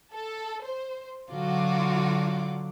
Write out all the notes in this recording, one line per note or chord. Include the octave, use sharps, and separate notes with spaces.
A4
C5
D3 F#3 F4 F#4 D6